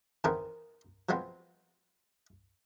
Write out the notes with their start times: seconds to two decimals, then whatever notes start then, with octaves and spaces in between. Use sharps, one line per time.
0.24 D#3 E3 B3 C4 G#4 A#4
1.09 F3 F#3 G#3 B3 C4